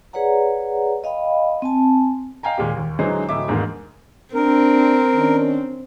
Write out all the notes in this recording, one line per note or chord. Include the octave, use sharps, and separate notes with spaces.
G#4 B4 C#5 D5 F#5 A#5
D#5 F5 G5 B5
C4 G#5 A5
D#5 F5 G5 G#5 A#5
D#2 A#2 G#3 G4
D#2
D3 E3 F#3 G#3 D#4 C5
D1 A2 D#4 E5 D6
E2 G#2 D3 D#3 G#3 A#3
C4 D4 A#4
D#3 C#4 D4